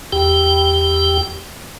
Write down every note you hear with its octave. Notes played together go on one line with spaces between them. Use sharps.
E2 G4 G5